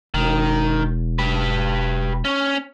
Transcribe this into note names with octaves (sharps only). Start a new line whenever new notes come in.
E1 D#3
G4 B4
C#4